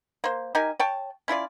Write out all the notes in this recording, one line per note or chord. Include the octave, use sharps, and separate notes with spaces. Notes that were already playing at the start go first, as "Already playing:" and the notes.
A#3 C5
D#4 G4 A#4 G#5
C#5 G5 A5
C#4 E4 F4 D5